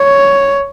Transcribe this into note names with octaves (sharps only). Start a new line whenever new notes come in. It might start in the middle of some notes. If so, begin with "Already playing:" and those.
Already playing: C#5